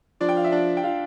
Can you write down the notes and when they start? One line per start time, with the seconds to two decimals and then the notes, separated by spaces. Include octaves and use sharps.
0.21 F3 D4 D5
0.29 G5
0.37 F5
0.44 E5
0.52 D4 D5
0.77 G5
0.83 F4 F5